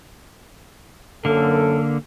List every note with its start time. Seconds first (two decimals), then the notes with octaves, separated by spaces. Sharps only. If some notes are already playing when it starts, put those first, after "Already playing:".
1.25 F#2 D3 A#3 A4